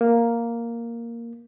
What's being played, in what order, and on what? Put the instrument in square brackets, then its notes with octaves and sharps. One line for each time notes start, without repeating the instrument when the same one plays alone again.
[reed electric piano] A#3